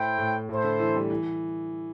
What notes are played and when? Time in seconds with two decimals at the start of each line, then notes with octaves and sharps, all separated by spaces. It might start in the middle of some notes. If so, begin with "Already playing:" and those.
Already playing: A2 E4 C5 G5
0.18 A2
0.49 A2 E4 A4 C5
0.64 D3
0.80 E3
0.95 G3
1.10 E3